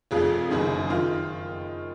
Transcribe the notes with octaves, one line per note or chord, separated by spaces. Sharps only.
F1 F2 F3 G#4
F#1 F#2 D#3
D#3 F4